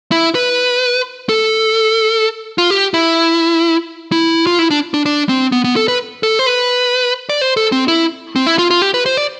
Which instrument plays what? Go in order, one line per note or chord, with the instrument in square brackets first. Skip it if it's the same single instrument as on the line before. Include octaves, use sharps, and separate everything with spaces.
[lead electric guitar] E4
B4
A4
F4
G4
E4
E4
F4
E4
D4
D4
D4
C4
B3
B3
A4
B4
A4
C5
B4
D5
C5
A4
C4
E4
C4
E4
F4
F4
G4
B4
C5
D5